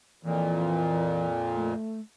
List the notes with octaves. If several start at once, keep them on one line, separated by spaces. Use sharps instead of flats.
F2 A#2 E3
A3